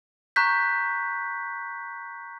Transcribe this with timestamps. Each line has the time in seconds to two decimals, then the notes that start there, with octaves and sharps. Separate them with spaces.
0.36 A#5 C#6 F#6 G6 B6